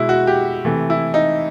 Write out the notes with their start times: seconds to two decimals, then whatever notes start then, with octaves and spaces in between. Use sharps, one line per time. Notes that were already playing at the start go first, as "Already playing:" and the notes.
Already playing: B2 G#3 E4
0.09 F#4
0.27 G4
0.65 C3 E3 A3
0.90 E4
1.14 D#4